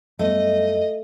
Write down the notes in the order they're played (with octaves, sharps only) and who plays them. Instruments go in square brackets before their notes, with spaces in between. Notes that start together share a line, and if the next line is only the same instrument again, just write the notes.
[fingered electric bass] F#2 G3 B3 [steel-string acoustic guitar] A3 [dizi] D#5